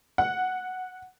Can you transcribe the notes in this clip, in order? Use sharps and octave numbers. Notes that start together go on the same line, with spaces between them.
F#5